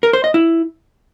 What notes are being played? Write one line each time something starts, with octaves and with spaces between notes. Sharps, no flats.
A#4
C5
D#5
E4